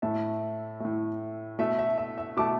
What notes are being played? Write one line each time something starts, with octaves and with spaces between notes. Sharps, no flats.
A2 A3 E5 A5
A2 A3
B2 A3 E5
E5
E5
E5
B2 A3 A5 D6